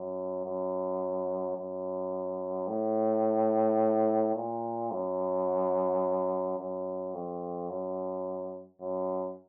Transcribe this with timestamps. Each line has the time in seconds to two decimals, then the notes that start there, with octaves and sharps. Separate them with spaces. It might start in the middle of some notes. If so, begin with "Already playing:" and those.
Already playing: F#2
0.46 F#2
1.57 F#2
2.68 A2
4.36 A#2
4.91 F#2
6.59 F#2
7.14 F2
7.70 F#2
8.81 F#2